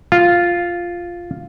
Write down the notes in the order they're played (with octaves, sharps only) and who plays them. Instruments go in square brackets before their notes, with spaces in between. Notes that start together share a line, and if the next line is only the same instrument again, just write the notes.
[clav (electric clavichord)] F4